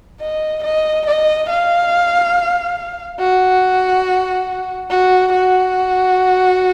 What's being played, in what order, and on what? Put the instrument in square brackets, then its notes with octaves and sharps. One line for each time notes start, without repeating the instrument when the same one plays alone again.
[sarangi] D#5
D#5
D#5
F5
F#4
F#4
F#4